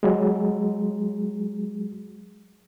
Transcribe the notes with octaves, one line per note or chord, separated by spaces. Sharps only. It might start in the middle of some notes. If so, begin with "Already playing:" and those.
F#3 G#3